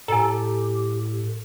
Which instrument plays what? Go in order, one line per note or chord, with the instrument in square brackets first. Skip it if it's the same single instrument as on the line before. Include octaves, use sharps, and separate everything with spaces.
[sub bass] A2 [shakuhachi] G4 [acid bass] A4 [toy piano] G#5 A#5